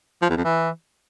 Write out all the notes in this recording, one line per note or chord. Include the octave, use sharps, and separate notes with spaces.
F3
E2
F2
E3